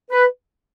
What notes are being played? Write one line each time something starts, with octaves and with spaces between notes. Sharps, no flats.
B4